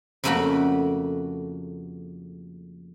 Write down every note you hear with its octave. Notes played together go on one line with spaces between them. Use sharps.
F2 C#3 A3 A#3 F#4 B5